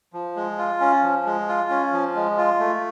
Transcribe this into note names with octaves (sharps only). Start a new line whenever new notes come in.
F3
G#3
F4
C#4
F3
G#3
F4
C#4
F3
G#3
F4
A3